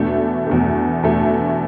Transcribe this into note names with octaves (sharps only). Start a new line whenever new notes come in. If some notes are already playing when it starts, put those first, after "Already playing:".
Already playing: E2 B2 A3 D4
E2 B2 A3
E2 B2 A3